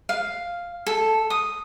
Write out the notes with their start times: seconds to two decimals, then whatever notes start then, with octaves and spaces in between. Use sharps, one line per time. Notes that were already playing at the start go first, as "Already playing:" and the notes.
0.09 F5
0.87 A4
1.30 D#6